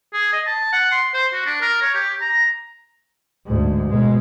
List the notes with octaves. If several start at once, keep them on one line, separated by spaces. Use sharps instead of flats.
G#4
D#5
A5
F#5
C6
C5
F#4
D4
A#4
C#5
G4
A#5
D2 G#2
B2 G#3